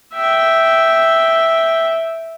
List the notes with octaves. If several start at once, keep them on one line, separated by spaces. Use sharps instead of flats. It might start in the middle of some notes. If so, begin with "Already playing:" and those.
E5 G5